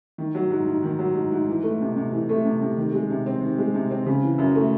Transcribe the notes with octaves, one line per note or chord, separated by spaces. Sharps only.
D#3
F#3
G#2
G#2
D#3
F#3
G#2
G#2
E3
A3
C3
C3
E3
A3
C3
C3
D#3
G#3
C3
C4
D#3
G#3
C3
C4
C#3
E3
F#2
A3